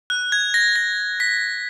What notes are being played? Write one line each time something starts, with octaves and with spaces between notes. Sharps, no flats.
F#6
G#6
A#6
A#6
B6